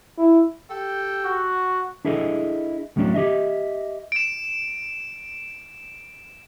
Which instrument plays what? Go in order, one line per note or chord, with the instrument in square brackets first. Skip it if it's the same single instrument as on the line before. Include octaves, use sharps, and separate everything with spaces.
[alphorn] E4
[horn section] G4 A4 G5
[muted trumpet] F#4
[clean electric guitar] D4 E4 G#4 A4 B4 D#5
D2 A2 F#3 C#4 D4
G4 D#5 E5
[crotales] D7 E7